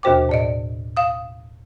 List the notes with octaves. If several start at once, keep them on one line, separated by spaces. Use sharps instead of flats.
D#2 B2 F#4 C5 G5 D6
A2 D5 D#5
F5 D#6